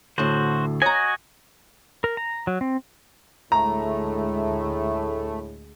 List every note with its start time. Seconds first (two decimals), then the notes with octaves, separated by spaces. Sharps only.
0.18 D2 A2 F#4 C5
0.82 F#4 C#5 D#5 G#5 A#5
2.04 A#4
2.17 A#5
2.47 F#3
2.61 C4
3.52 D2 A2 G#3 A3 A#5